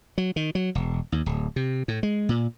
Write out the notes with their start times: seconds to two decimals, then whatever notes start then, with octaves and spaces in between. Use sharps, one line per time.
0.18 F#3
0.36 D#3
0.55 F#3
0.75 E1
1.12 D#2
1.26 D1
1.56 C3
1.88 A2
2.03 G#3
2.29 A#2